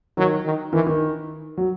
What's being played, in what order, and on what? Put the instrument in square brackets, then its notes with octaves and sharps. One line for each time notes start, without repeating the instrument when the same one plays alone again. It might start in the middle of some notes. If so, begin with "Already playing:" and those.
[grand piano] D#3 [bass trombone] F#3
[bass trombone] D#3
[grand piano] D#3 [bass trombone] E3
[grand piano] D#3
F#3